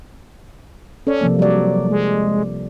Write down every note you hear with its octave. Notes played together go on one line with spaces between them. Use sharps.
C#4 A4 D5
C3 F3 A#3
F#3 G3 D5
G#3